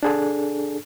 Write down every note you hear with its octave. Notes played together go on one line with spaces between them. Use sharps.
D4 G#4 A4